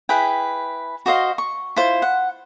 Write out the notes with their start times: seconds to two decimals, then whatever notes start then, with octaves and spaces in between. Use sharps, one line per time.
0.09 E4 G#4 B4 G5
1.06 F#4 C5 D#5 F5
1.38 C#6
1.76 E4 F4 C5
2.02 F#5